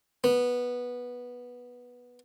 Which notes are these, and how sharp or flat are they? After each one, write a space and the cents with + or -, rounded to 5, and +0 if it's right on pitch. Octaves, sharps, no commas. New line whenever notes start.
B3 -10